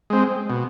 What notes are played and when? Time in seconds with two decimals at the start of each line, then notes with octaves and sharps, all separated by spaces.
0.10 G#3 C4
0.50 B2